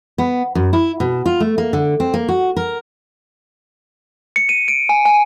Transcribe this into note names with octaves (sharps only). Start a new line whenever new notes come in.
B3
F#2
E4
B2
F4
A3
A#3
D3
C4
A#3
F#4
A#4
C#7
D#7
D7
G#5
G#5